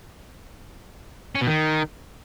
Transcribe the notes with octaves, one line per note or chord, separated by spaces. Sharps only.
C#4
B2
D#3